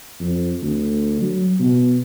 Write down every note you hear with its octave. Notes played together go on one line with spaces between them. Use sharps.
F2
D2
F#3
B2